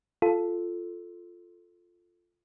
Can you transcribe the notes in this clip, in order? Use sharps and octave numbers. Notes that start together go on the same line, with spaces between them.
F4 A4